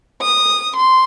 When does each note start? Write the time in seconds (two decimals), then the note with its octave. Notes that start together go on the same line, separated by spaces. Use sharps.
0.21 D#6
0.75 C6